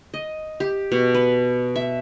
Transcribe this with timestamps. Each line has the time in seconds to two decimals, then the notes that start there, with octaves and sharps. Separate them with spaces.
0.14 D#5
0.60 G4
0.92 B2
1.14 B4
1.76 E5